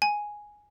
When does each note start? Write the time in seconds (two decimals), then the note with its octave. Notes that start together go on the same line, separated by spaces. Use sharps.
0.02 G#5